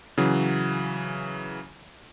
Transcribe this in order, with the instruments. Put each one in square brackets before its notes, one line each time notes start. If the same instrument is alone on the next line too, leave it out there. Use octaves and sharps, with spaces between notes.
[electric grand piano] C#3 E3 F#3